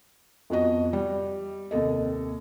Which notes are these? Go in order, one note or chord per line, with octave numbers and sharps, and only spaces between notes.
F2 B3 F#4 D#5
G3
D#2 C3 A4 D#5